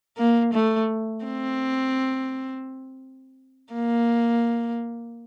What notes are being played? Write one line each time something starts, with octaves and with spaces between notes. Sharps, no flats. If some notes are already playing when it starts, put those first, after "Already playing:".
A#3
A3
C4
A#3